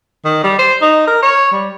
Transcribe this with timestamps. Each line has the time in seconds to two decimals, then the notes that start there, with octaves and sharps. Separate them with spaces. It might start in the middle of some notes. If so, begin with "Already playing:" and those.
0.25 D#3
0.44 G3
0.59 C5
0.82 D#4
1.07 A#4
1.22 C#5
1.52 G3